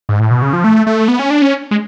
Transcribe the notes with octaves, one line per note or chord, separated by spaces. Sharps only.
G#2
A2
B2
C#3
F3
A3
A3
B3
C#4
D4
C#4
G#3